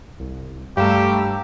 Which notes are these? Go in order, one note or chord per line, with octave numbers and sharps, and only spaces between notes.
C2
G2 G3 A3 G4 F5 G5 A#5 E6